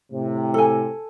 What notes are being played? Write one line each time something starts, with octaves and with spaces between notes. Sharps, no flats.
A2 C3
A4 G#5